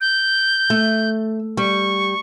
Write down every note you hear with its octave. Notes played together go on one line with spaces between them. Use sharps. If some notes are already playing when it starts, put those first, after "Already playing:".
G6
A3
G3 C#6